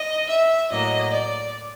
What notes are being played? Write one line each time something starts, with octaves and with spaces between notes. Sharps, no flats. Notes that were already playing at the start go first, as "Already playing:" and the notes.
Already playing: D#5
E5
A2 F#3 A#3 D#5
D5